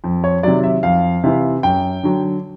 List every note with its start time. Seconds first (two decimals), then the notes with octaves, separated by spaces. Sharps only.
0.04 F2
0.24 C#5
0.43 C3 D#3 F#3 D5
0.64 E5
0.83 F2 F5
1.24 C3 E3
1.63 F#2 G5
2.03 D3 F#3